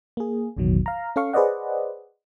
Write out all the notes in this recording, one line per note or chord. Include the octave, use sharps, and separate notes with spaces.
A#3 G#4
A1 E2 B2 D#3 F#3
F5 A#5
C#4 A4 F5 C#6
G#4 B4 C5 D5 D#5 F#5